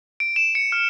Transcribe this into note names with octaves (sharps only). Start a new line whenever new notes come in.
D7
E7
C#7
F6